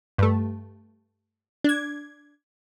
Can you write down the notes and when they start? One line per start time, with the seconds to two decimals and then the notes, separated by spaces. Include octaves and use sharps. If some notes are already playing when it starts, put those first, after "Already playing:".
0.18 G2 A3
1.64 D4 G#6